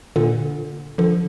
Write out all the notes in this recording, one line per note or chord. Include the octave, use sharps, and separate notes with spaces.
A#2 D3
D3 F3